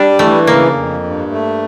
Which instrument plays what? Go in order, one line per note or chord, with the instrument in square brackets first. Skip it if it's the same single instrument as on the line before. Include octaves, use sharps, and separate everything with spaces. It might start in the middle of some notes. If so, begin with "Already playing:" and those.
Already playing: [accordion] G3 [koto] D4
[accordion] E3 [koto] A3
[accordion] C#3 [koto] A#3
[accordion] F2
G2
A3